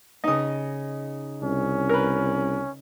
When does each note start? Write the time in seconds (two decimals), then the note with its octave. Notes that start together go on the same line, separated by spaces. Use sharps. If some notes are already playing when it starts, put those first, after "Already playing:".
0.24 C#3 D#4 D#5 D#6
1.43 C2 C#4
1.89 A#4 B4